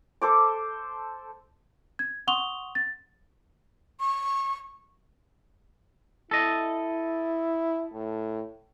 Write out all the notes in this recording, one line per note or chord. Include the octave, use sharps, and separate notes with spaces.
A4 C5 D6
G#6
F#5 C6 C#6 D#6 F7 G7
A6
C#6
E4 A4 D#5
A2